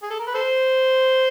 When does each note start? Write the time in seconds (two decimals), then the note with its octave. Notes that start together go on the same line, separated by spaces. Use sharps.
0.03 G#4
0.10 A4
0.19 A#4
0.27 B4
0.34 A4 C5